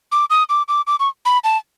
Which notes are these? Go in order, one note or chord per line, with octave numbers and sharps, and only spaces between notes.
D6
D#6
D6
D6
D6
C#6
B5
A5